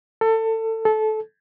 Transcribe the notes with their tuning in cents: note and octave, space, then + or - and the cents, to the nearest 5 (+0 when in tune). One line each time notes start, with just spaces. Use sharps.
A4 +25
A4 -20